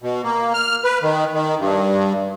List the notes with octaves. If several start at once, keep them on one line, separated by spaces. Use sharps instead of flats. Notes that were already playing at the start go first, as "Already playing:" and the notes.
B2
A#3
F6
B4
D#3
D#3
G2